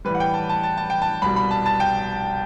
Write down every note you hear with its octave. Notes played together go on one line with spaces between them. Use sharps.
A2 E3 G3 B4
F#5
G5
A5
A5
A5
A5
G5
A5
C2 B2 G3 B5
B5
A5
A5
G5